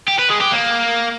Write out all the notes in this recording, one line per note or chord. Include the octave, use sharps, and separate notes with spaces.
G4
B4
G#3
G4
A#3